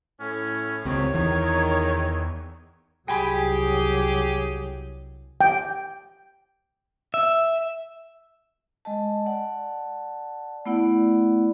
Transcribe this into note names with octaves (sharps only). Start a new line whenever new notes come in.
A2 C#4
C#2 F#2 C3 D#3 C4 C#5
E2 D#3 E3
C2 F#3 G4 G#4 G5 G#5 B5
G5
E5
G#3 D#5 A5
D5 F#5 A5
A3 B3 E4 D5 F#5